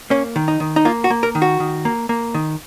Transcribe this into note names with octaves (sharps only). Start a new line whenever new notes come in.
A#3 C#4
D#3
D#4
D#3
D#4
A#3 F4
F#4
A#3
A#4
D#3
F#4
D#3
A#3
A#3
D#3